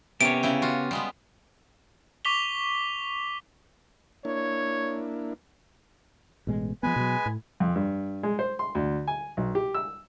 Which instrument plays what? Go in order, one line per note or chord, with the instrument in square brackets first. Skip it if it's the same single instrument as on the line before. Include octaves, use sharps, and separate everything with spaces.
[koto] C3 A#4 C#5 [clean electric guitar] B3 C#4 G4 [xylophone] D7
[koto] C#3 E4 G5
F4 F#4
G3 G#3 B3
[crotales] C#6 D6 B6 F7 G7
[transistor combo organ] A#3 D4 E4 [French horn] C#5
[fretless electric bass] A1 B2 G#3
[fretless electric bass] F3 G3 B3 [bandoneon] G#3 B4 G#5
[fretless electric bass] B2 F#3
A2
[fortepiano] F2
G2
G#3
C5
C6
D2
G#5
B1
G4
E6